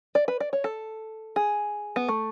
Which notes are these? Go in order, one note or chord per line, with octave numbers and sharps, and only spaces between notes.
D5
B4
D5
C#5
A4
G#4
B3
A3